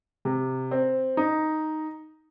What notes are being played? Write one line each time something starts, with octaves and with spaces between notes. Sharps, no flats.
C3
C4
D#4